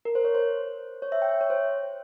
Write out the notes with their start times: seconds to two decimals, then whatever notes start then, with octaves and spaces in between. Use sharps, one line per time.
0.05 A#4
0.15 C5
0.24 C#5
0.35 C5
1.02 C#5
1.12 E5
1.22 G5
1.31 E5
1.41 C#5
1.50 C5